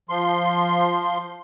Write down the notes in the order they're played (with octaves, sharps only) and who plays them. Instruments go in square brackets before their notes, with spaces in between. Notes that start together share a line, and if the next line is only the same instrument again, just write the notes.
[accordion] F3 C6